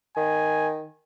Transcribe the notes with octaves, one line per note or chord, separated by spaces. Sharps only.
D#3 G#5